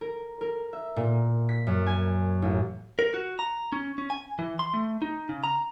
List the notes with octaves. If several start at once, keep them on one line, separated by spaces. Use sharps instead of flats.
A#4
A#4
E5
A#2
B6
F#2
G#5
A1
A#4
F#4
A#5
C#4
C#4
G#5
E3
C6
A3
D#4
C#3
A#5